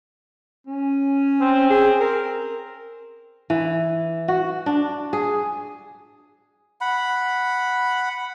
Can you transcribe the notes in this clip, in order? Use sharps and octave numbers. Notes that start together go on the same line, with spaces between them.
C#4
C4
G#4
A#4
E3
F#4
D4
G#4
F#5 B5